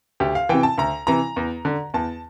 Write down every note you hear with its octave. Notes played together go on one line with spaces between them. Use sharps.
D2 G4
F5
C3 E3 G5
A5
D2 A#5
C3 E3 A#5
E2
D3
E2 A5